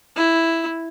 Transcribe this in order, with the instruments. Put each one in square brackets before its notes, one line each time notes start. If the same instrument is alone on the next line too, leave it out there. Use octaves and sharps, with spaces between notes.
[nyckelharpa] E4